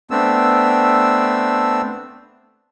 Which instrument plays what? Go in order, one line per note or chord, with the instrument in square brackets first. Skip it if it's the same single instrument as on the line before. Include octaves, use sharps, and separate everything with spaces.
[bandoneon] A3 B3 C4 D4 E6